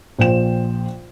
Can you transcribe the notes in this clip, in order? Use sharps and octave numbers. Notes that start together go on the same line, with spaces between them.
A#1 F3 C5 G5 E7